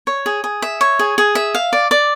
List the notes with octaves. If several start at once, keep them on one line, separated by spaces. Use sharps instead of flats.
C#5
G#4
G#4
E5
C#5
G#4
G#4
E5
F5
D5
D5